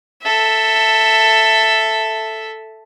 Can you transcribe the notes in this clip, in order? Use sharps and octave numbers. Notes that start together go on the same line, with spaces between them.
A4 E5